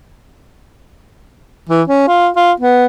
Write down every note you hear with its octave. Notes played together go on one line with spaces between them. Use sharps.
E3
C#4
F4
F4
B3